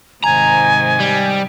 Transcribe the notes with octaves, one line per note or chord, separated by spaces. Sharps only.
G#2 C3 D#3 G#5 A#5
G3